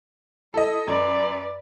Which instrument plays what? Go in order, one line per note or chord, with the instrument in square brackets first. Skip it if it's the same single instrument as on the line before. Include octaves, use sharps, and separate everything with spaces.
[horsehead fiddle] E4 [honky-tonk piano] A4 D#5
[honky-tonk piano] F#2 [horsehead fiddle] B4 D5